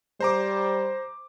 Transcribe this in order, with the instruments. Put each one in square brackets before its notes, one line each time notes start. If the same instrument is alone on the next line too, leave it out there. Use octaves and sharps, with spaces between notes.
[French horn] G3 [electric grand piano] C5 A#5 D6